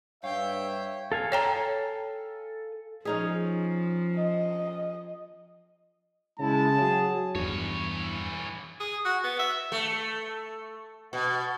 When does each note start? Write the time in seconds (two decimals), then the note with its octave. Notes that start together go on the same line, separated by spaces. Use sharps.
0.24 G2 C#5 E5 F5 G5
1.12 A4 F5 G#5
1.32 C#5 G5 A#5
3.05 F3 C#4 D#4 G#4
4.15 D#5
6.39 C#3 G#3 E4 A5
6.80 F#3 G#4
7.35 E2 G2 E3 C#5
8.80 G#4
9.05 F#4
9.24 B3
9.39 E5
9.72 A3
11.13 B2